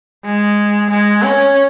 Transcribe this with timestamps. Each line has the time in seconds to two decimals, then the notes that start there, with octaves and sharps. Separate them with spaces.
0.25 G#3
0.90 G#3
1.23 C#4